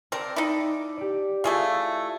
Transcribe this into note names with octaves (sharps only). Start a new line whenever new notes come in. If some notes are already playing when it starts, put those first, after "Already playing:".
C4 A#4 D5 G5 A5
D#4 E4
D6
G4 D5
A3 E4 F4 G#4 F5 G#6